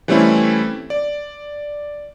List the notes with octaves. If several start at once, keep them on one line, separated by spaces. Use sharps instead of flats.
E3 G3 A3 C4 C#4 E4
D5